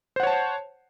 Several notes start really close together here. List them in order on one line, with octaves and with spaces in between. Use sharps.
C5 F#5 C#5 A5